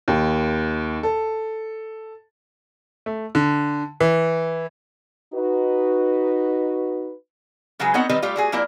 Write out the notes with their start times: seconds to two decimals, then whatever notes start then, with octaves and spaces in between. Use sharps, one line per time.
0.08 D#2
1.03 A4
3.06 A3
3.35 D3
4.00 E3
5.34 D#4 F#4 B4
7.80 C#3 F#3 G#3 F#4 G#4 B4
7.94 B3 C4 D#4 A#4 C#5 F#5
8.09 D#3 G3 C4 D#4 B4 D#5
8.22 G3 A3 F4 G4
8.36 A3 F#4 G#4
8.52 F3 A#3 E4 F4 A#4 D5